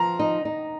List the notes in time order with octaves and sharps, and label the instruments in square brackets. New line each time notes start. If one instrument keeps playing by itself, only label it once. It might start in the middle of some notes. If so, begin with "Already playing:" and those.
Already playing: [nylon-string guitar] F3 [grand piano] A#5
[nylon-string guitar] D#4
D#4